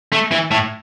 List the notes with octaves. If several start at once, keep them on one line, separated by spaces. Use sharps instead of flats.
A3
E3
A2